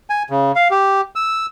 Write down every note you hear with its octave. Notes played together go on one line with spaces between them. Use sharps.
G#5
C#3
F5
G4
E6